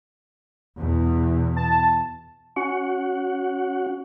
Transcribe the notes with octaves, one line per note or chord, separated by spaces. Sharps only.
E2 B2
A5
C#4 F#4 F#5